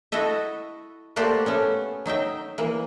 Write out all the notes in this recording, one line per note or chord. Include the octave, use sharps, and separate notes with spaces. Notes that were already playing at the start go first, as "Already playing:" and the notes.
E4 F#4 A4 D#5 E5
A3 A#3 F#4 G4 C5 D5
A3 B3 C#4
F#3 D#4 E5 G5
E3 A#3